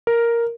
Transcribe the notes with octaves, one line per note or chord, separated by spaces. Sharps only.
A#4